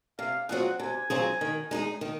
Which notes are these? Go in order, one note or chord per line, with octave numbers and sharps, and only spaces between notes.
C3 F5
F#3 C4 F4 G#4 F#5
C3 G#5
F#3 C4 F4 G#4
D#3
G#3 D#4 G#4
D#3